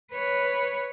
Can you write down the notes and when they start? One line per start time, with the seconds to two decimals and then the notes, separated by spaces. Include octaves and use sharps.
0.12 B4 C#5